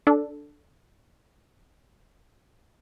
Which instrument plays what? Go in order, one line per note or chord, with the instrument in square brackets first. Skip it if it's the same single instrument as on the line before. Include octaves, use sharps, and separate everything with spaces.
[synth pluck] D4 A4